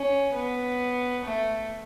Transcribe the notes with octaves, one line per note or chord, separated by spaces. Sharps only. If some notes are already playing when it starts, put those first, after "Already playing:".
Already playing: C#4
B3
A3